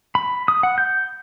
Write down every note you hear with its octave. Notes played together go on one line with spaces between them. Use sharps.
B5
D#6
F#5
G6